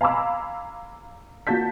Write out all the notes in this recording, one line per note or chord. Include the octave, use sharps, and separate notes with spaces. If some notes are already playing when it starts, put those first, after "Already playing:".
F5 G#5 A#5 B5 D6 E6
A#3 F4 F#4 A5 G6 B6